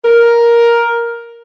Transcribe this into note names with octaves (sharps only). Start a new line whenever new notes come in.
A#4